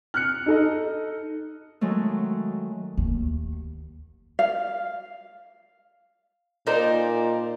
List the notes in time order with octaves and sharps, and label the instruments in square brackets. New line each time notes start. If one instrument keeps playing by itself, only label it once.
[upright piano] F6 F#6 C#7
D#4 A4 D#5
[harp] D#3 F#3 G#3 A3
[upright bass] D#2
[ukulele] F5
[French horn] A#2 [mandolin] D#4 C5 [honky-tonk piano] A#4 D5